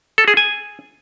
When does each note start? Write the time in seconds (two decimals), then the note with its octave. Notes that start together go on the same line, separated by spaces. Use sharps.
0.18 A4
0.28 G#4
0.37 G#5